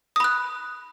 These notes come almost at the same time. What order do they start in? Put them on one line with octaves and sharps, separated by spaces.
D#6 B5 F#6